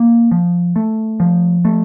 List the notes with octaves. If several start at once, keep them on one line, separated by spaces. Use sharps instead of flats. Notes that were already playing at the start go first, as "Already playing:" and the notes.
Already playing: A#3
F3
A3
F3
A3